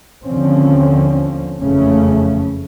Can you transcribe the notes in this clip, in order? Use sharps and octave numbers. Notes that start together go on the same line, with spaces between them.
D#2 D3 F3 C4 C#4
F#1 F2 C#3 E3 A3 C#4